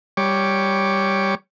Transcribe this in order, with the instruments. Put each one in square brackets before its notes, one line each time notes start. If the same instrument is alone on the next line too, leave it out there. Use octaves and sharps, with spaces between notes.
[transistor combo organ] G3 C#5 D6